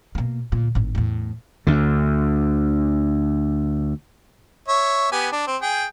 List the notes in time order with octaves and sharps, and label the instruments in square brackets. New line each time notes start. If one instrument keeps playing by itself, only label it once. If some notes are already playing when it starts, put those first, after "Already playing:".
[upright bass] B2 A#3
D2 A#2
G#1 A2
E2 A2
[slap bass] D2 D3
[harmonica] C#5 E5
B3 G4 G#5
D4
C4
G#4 G5